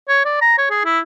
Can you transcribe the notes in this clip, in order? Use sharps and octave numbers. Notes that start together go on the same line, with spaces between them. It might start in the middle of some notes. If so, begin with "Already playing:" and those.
C#5
D5
A#5
C#5
G#4
E4